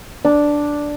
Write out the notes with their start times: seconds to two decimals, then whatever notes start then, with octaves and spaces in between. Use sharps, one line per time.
0.25 D4